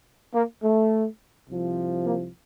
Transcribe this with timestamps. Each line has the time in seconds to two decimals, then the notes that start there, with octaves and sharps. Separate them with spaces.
0.34 A#3
0.62 A3
1.49 C2 C3 F3
2.06 A#3